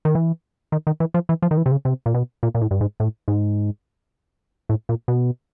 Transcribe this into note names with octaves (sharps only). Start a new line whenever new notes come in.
D#3
E3
D#3
D#3
E3
F3
E3
F3
D#3
E3
C3
C#3
C3
A#2
B2
A#2
A#2
A2
G2
G#2
A2
G#2
A2
A#2
B2